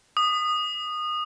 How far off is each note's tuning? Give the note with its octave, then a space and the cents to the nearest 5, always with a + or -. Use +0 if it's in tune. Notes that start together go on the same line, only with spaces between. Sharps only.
D#6 -20